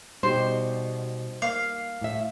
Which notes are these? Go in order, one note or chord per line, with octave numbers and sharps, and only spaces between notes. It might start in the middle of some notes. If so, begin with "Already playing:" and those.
B2 G3 D#4 G4 C5
A#3 F5
A2 E5